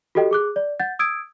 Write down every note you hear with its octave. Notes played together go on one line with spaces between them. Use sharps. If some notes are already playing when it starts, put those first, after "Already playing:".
F#4 G4 A4 D#5 G5
G#4 D6 F#6
D5
F#5 G6 A6
D#6 E6 G#6 D7